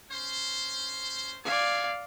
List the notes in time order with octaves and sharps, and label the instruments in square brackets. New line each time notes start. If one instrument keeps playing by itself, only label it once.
[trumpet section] C#4 C5
[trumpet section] B3 G#5 [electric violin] D5 F5